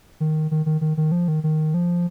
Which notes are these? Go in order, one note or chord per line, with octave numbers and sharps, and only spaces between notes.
D#3
D#3
D#3
D#3
D#3
F3
D#3
D#3
F3